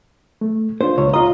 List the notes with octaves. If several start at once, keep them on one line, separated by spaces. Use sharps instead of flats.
A3
A#3 D4 F4 C5
C#2 C#5
F4 D#5 A#5